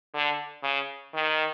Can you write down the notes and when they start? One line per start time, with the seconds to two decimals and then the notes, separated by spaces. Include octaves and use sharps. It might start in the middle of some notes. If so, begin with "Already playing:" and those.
0.14 D3
0.64 C#3
1.14 D#3